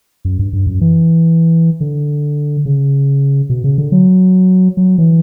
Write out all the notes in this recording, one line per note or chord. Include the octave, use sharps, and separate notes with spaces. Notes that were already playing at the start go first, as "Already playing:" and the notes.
F#2
G2
G2
F#2
E3
D3
C#3
B2
C#3
D3
F#3
F#3
E3